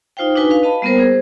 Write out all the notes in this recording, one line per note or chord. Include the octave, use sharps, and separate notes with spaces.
D#4 F4 C5 F5 G5
D4 D#4 F#4 B4 G#5
B4 F5
D#5 F5 A5 B5
G3 A#3 B3 F4 A#4 C5
G#4 C5